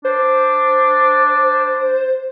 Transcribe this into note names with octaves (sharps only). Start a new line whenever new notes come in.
D4 C5